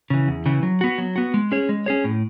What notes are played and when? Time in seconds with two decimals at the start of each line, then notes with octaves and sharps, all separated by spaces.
0.10 C#3 E3
0.28 E2
0.46 C#3 E3
0.63 F#3
0.81 B3 F#4
0.98 F#3
1.16 B3 F#4
1.34 G#3
1.52 C#4 G#4 C#5
1.69 G#3
1.86 C#4 G#4 C#5
2.04 A2